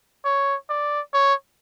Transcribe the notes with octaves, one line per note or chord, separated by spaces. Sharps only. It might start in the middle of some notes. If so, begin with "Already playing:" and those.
C#5
D5
C#5